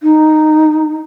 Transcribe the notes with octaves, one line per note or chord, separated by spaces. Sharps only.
D#4